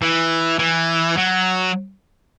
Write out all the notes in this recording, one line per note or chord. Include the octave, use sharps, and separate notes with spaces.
E3
E3
F#3